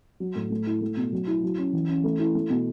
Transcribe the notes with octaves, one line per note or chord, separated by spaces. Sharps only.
F#3
A2
A3
E4
A3
B2
F#3
E4
F#3
C#4
E3
C#4
A3
E4
A3
B2